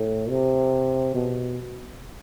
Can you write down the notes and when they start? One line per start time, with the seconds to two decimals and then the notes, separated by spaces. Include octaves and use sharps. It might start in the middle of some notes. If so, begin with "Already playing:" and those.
Already playing: A2
0.30 C3
1.14 B2